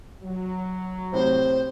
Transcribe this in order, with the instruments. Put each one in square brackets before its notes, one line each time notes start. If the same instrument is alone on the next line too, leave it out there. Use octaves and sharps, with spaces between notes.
[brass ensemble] F#3
[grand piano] A2 C3 C4 [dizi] C5